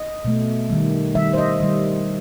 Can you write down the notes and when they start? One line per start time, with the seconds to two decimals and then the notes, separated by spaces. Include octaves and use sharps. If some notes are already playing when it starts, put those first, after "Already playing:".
Already playing: D#5
0.25 B2 A3
0.70 D#3 G3
1.15 D#3 G3 E5
1.33 C5
1.38 D#5
1.60 D#3 G3